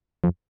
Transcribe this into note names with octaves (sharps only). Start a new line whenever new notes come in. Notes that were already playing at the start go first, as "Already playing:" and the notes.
F2